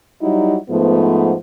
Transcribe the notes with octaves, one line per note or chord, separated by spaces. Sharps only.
F#3 G3 D#4 E4 F#4
G#2 F3 A3 B3